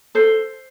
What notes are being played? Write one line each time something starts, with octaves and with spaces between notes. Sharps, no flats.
A4 C5